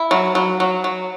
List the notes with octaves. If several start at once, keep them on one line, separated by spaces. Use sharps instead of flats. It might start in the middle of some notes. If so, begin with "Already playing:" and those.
Already playing: E4
F#3
F#3
F#3
F#3